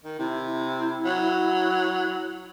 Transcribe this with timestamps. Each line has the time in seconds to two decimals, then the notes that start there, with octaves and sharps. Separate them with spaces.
0.04 D#3
0.19 C3 E4
1.05 F#3